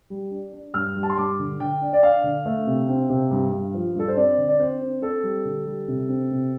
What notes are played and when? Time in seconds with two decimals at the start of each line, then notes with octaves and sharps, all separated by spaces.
0.10 G3
0.31 D4
0.53 D4
0.74 G2 F6
0.96 G3
1.03 A5
1.10 C6
1.18 G2 D6
1.39 D3
1.60 D3 G5
1.81 D4
1.93 D5
2.03 D4 F5
2.23 D3
2.45 A3
2.67 C3
2.89 C4
3.09 C3
3.31 G2
3.52 G2
3.74 F3
3.95 G2 A4
4.08 C5
4.17 C4 D5
4.38 D3
4.49 D5
4.59 C4 C5
4.81 C4
5.02 C4 A4
5.23 G3
5.45 D3
5.66 G3
5.88 C3
6.09 C4
6.30 C3